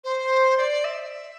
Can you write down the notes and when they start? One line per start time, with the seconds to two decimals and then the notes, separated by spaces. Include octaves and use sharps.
0.04 C5
0.57 D5
0.84 E5